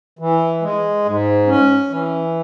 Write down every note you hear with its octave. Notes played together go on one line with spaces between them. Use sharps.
E3
G#3
G#2
C#4
E3